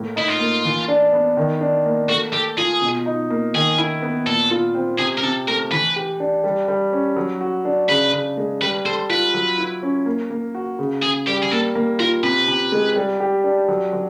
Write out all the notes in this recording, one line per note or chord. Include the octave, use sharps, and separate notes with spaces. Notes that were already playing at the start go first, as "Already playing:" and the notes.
Already playing: A2 A#3
D#4 E4
F4
A#3
E3
D4
B3
D#3
D4
A#3
A3 F#4
G4 A4
F4 G#4
B2
D#4
A#3
D#3 G#4
E4
B3
A#2 A4
F4
C4
C3 G#4
A#4
C3 A4
A3 A#4
E3 B4
G4
D4
G3
G3
C#4
F#3
F#4
D4
C#3 B4
C#3
G#3
G3 B4
A4 C5
F4 B4
F#3
E4
C#4
A#3
A#3
F#4
C#3
C#3 G#4
G3 G4
G#4
A#3 A4
A#3
F4 A#4
C3 B4
C3
G#3
G3
G4
D4
F#3
F#3